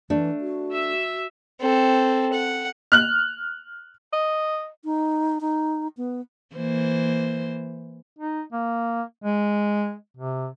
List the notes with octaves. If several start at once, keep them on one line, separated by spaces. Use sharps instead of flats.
E3 A3 D4
F#4
E5 E6
C4 A4
F#5
F6 F#6 F#7
D#5
D#4
D#4
B3
E3 A#3 C5
D#4
A#3
G#3
C3